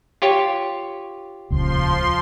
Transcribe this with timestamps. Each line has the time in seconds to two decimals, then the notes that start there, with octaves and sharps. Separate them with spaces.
0.22 F4 G4 C#5
1.50 D#1 C#2 F3 C6